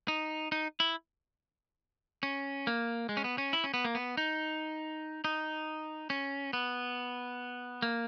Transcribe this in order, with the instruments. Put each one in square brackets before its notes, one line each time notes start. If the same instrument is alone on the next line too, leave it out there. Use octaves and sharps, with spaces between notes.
[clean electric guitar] D#4
D#4
E4
C#4
A#3
G#3
C#4
B3
C#4
E4
C#4
B3
A#3
B3
D#4
D#4
C#4
B3
A#3